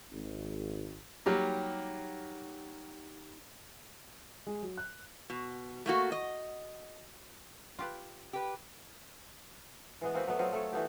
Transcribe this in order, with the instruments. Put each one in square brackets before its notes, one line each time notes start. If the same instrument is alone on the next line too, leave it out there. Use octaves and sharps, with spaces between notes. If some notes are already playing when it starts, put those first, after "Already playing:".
[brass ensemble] G#1
[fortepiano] F#3 G3 A#3 [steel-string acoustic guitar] D#4 G4
[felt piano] G#3
F#3
F#6
[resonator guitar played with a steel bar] B2
A3 A#3 F#4
D#5
[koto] F4 G4 B4
[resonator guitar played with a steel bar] G4 B4
[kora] E3 G#3 B3
A#3 C4 F#4 B4
F#3 A3 B3
F#3 C4 F4 D#5
A3 A4 C#5
E3 A3 B3 G4